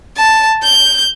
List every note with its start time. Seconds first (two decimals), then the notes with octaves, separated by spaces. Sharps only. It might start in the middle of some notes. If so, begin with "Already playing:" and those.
0.18 A5
0.63 G6